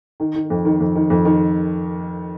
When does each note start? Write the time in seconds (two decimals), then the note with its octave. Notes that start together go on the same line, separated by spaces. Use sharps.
0.20 D#3
0.35 D#3
0.50 F2
0.65 D#3
0.80 F2
0.95 D#3
1.10 F2
1.25 D#3